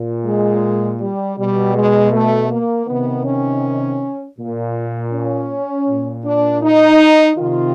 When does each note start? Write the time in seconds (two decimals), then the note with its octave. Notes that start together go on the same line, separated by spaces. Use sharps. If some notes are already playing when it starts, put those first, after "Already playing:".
Already playing: A#2
0.24 G#3
1.00 G3
1.37 B2 G3
1.74 G#3
2.12 A3
2.50 A#3
2.87 C3 D#3 B3
3.24 C#4
4.37 A#2
5.12 C#4
5.88 A#2
6.24 D4
6.62 D#4
7.37 C3 D#3 F4